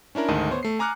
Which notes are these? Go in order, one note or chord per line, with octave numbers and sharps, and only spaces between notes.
C#4 D4 E4 A#4
D2 G#2 D#3 D#5 A5 D#7
B3 C5 C#5
A3 C7
G#5 A#5 D6 F6 F#6 C#7